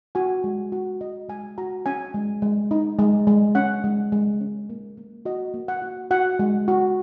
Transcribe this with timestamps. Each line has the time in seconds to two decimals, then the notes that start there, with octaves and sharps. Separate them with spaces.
0.15 F#4 G#5
0.44 G#3
0.72 F#4
1.01 F#4 D#5
1.29 G#3 G#5
1.58 F#4 A#5
1.86 C#4 G#5
2.14 G#3
2.42 G#3
2.71 D#4
2.99 G#3
3.27 G#3
3.55 C#4 F#5
3.84 G#3
4.12 G#3
4.41 C#4
4.70 A#3
4.97 A#3
5.25 F#4 D#5
5.54 A#3
5.68 F#5
5.82 F#4
6.11 F#4 F#5
6.39 G#3
6.68 F#4